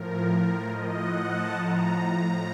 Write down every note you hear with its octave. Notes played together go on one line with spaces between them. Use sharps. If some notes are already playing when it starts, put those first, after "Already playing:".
Already playing: A2 F3 A#4
A2 F3 D#5
F#5
A5
A2 F3 A#5